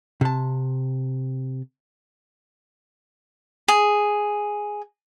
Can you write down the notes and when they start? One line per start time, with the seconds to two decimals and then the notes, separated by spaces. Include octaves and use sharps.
0.21 C3 A5
3.68 G#4